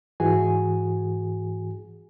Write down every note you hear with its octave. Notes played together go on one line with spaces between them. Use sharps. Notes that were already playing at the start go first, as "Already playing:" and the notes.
G#2 E3 F#4 G#4 G#5